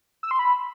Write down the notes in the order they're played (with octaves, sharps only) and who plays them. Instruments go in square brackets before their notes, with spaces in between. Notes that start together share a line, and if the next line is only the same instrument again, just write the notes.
[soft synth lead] E6
C6
B5